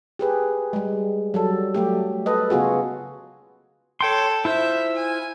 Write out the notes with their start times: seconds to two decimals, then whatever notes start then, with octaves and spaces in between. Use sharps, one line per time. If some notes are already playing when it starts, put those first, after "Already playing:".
0.19 G4 G#4 B4
0.73 G3 G#3
1.34 F#3 G3 A4
1.75 F#3 A3 G4
2.26 A4 B4 D#5
2.50 C#3 B3 F4 F#4 G#4
4.01 A4 C#5 G5 C6
4.45 E4 F4 C5 E5
4.96 G#5